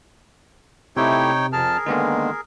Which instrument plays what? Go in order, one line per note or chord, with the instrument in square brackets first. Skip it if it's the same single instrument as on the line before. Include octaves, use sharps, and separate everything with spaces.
[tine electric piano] C3 [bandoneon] A3 E4 G4 [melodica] D#4 C#5 G5
[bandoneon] F2 A5 F6 [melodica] G#4 A#4
[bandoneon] D3 D#3 G#3 [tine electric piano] A#3 B3 D#4